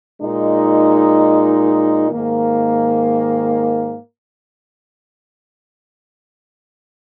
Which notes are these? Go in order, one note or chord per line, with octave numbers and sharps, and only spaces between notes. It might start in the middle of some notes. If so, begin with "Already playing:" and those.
A#2 G#3 D#4
G#2 D#3 A#3